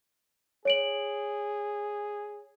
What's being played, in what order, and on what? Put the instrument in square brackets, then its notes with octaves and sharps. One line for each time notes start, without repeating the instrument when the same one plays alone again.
[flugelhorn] G#4 [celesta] C#5 D7 F#7